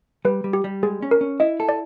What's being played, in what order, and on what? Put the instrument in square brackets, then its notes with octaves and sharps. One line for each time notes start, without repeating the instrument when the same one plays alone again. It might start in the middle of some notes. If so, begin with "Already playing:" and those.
[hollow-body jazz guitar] G3 [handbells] B4
[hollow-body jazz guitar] G3
[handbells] G4
[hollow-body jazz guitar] G3
[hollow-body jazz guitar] G#3 [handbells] G#4
[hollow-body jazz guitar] C#4
[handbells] A#4
[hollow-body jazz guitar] C#4
[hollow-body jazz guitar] E4 [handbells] D#5
[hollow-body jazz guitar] A4
[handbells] D5